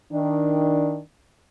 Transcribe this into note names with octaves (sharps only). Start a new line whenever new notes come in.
D#3 D4